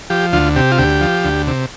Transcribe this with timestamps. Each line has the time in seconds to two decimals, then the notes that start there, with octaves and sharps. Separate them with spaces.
0.10 F3 G4
0.33 D2 F4
0.56 C3 G4
0.72 F4
0.78 D2 G4
1.01 F3
1.24 D2
1.47 C3